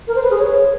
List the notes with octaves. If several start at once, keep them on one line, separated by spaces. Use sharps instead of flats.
A#4
C5
B4
G#4
C#5